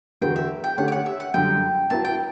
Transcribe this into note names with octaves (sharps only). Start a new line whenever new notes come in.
E2 D3 F#3 B3 F#4 G5
E5
G5
D3 A3 C#4 G4 C#5 F#5
G5
F#5
E5
F#5
F#2 D3 G3 G5
F#3 B3 E4 A5
G5